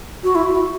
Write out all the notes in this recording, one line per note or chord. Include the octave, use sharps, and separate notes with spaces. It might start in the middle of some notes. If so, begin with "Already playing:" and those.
F#4
E4
F#4